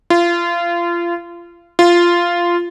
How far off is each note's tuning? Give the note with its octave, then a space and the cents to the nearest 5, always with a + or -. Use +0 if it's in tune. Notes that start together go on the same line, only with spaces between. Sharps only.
F4 -25
F4 -10